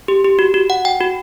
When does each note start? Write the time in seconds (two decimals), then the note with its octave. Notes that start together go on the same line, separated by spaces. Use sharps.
0.08 G4
0.24 G4
0.39 F#4
0.54 F#4
0.70 F#5
0.85 G5
1.01 F#4